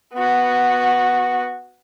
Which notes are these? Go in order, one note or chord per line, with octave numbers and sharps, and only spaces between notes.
B3 F#4